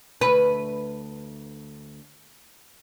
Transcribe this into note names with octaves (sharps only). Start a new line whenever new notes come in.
D2 B4